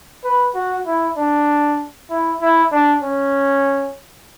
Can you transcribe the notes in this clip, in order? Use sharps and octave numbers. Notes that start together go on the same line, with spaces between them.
B4
F#4
E4
D4
E4
E4
D4
C#4